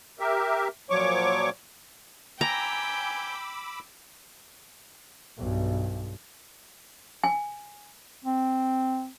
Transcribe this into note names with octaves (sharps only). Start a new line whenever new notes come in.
G4 A#4 E5
A#2 F3 F#3 C#5 C#6 D6
G5 G#5 A#5 B5 D6 E6
B1 G2
G#5
C4